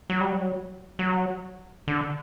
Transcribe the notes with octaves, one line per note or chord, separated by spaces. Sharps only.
F#3
G3
F#3
F#3
D3